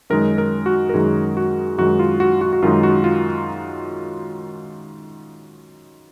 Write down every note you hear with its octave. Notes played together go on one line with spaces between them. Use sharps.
F#2 D#3 G#3 D#4 A#4
A#4
F#4
A#4
F#2 D#3 G#3 D#4 G#4
F#4
F#2 D#3 G#3 D#4 F#4
F4
F#4
F#4
F#4
F#2 D#3 G#3 D#4 F4
F#4
F4